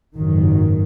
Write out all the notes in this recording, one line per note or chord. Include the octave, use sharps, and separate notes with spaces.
F#1 G#2 D#3 F#3